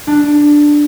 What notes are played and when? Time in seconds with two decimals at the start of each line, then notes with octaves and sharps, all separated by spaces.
0.07 D4